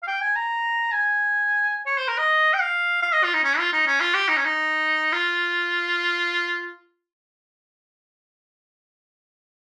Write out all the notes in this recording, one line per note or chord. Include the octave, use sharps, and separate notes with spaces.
F5
G5
G#5
A#5
G#5
C#5
C5
A#4
D#5
G5
F5
F5
D#5
F4
D#4
C#4
F4
D#4
C#4
F4
G4
D#4
C#4
D#4
F4